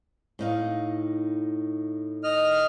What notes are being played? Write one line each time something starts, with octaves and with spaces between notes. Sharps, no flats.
A2 D#4 F5
D#5 F6